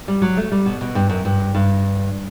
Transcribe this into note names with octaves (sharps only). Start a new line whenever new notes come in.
G3
F#3
A3
G3
B2
B2
G2
F#2
G2
G2